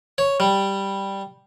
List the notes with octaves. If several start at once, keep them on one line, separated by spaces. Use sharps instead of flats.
C#5
G3